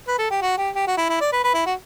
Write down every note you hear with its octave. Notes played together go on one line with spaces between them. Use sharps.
B4
A4
G4
F#4
G4
G4
F#4
E4
E4
D5
B4
B4
E4
F#4